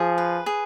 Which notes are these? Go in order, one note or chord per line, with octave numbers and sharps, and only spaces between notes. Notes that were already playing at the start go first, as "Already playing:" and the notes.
Already playing: F3 G#4
B4
G#4